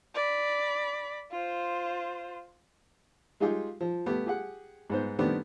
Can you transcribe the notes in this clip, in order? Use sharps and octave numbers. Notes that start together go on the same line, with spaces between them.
D5 B5
F4 C5
G#3 D#4 F4 G4 G#4
F3
A3 B3 G4
G4 G#4 F#5
G#2 B3 C5
D#3 A3 B3 C4 D4 G4